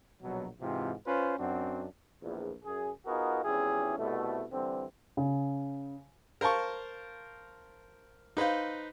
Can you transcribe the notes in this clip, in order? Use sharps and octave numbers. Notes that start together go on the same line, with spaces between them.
A#1 B2 F#3
G#2 C3 E3 C4 F4
C#4 F4 B4 C5
F#2 C4 D4 F#4
A#1 E2
F#2 G#4
B3 D#4 F4 F#4 G#4 A#4
G#1 E2 C#4 E4 G4 G#4
C2 B2 A3
D3 E3 G3 C4
C#3
A#4 C5 F5 A5 C#6
D#4 B4 C5 F5